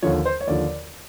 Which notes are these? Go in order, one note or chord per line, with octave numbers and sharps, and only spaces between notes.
D#2 D3 F3 C#5
C5
C#5
D#2 D3 F3 D5